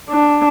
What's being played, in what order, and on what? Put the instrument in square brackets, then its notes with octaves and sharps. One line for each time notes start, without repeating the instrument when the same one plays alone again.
[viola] D4